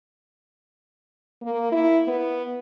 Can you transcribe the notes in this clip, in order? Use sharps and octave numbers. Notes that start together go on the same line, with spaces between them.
A#3
E4
B3